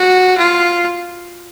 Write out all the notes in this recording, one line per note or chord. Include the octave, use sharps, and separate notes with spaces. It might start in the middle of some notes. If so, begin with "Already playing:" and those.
Already playing: F#4
F4